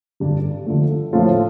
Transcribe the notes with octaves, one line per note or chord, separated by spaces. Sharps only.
G2 D3 G3 D4
D3 F3 A3
A2 F3 A3 F4